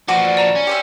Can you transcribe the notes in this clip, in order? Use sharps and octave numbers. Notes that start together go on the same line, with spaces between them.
F3 D4 F#4 B4 D6
D5
D5 A#5 E7
C#4
G4 C5 E5